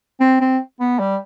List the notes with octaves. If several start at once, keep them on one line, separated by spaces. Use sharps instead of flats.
C4
C4
B3
G3